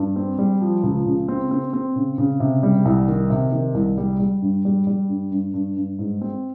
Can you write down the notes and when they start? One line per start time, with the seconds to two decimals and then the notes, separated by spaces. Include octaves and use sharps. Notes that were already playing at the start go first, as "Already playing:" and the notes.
Already playing: G2
0.16 C4
0.39 G3
0.61 F3
0.83 C#2
1.06 C#3
1.28 C4
1.51 C4
1.73 C4
1.96 C#3
2.18 C#3
2.40 C3
2.63 G3
2.85 C2
3.08 D#3
3.30 C3
3.52 D#3
3.74 C2
3.98 G3
4.19 G3
4.42 G2
4.65 G3
4.87 G3
5.09 G2
5.32 G2
5.54 G2
5.76 G2
5.99 G#2
6.22 C4